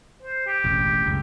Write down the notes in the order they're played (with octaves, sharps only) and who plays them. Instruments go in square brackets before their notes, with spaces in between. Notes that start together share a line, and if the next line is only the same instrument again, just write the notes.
[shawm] C5
G4
[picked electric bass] E1 A1
F#1 C#2